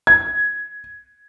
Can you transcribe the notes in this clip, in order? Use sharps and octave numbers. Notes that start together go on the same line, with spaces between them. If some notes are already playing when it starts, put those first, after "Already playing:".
G#6